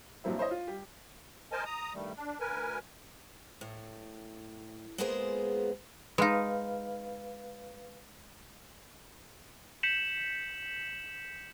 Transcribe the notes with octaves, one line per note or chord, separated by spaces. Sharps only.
G2 A#2 F3 F#3 C4 E4
E4 C5 C#5 D#5
F4
G3 G4
A#4 C5 D#5 G#5 A5
A#5 D#6
G2 D#3 G3 A3
D4
D2 A#4 B4 G#5
A2
G#3 A#3 B3 F4 G#4 C5
G#3 D#4 B4 F5
G6 B6 C#7 E7 F#7